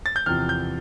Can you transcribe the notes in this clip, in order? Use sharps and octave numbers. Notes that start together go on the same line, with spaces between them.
A6
G6
E2 C3 F3 F6
G6